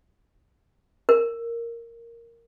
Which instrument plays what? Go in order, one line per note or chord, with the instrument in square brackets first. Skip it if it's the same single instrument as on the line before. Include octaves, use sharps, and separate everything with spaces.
[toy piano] A#4